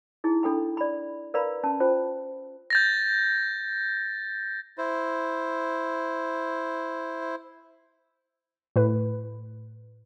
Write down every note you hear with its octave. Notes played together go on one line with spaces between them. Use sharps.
D#4 E4 G#4
D4 A4 G5 B5
D5 B5
A#4 B4 D5 F5 A#5 B5
C#4 A5
F4 C5 G5
G6 A6 A#6
E4 C5
A2 B4